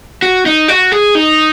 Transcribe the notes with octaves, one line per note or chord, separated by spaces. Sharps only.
F#4
D#4
F#4
G#4
D#4